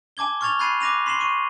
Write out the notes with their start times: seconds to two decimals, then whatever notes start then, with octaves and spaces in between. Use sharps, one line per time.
0.17 G#5 A5 D6 G#6 G7
0.41 C#6 F6 G#6 A6 F7 G7
0.59 B5 F#6 G#6 A6 C7 D#7
0.80 D6 F#6 A#6 D#7 F7
1.06 C6 B6 C7 E7 F#7 G7
1.20 C#6 D#7